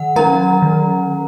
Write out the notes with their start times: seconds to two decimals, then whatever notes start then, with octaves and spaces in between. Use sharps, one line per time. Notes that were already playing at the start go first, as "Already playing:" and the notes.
Already playing: D#3 F#5
0.16 F#3 C#4 A#4 A#5
0.62 D#3